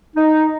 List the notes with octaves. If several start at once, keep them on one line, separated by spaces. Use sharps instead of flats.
D#4